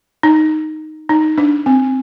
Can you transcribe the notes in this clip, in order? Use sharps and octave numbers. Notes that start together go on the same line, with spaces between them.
D#4
D#4
D4
C4